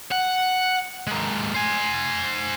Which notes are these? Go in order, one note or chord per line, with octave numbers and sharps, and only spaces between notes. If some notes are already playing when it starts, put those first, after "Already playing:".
F#5
G#3 A#3
C5 G#5